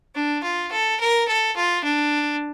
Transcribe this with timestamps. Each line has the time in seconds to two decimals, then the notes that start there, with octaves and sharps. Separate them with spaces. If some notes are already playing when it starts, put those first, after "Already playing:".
0.15 D4
0.43 F4
0.72 A4
1.00 A#4
1.28 A4
1.56 F4
1.84 D4